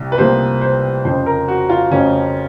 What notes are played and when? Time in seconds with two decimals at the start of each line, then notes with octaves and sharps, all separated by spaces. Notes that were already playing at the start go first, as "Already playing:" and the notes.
Already playing: C2 C3
0.12 B4
0.18 C2 C3 F3 A#3 C5
0.61 C5
1.04 F2 C#3 F3 C5
1.26 A#4
1.48 F#4
1.69 F4
1.91 F2 C#3 F3 C#4